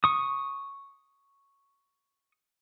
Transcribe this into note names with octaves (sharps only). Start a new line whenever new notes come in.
C#6 D#6